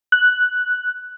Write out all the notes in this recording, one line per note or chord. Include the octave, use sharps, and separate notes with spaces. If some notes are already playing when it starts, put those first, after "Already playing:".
F#6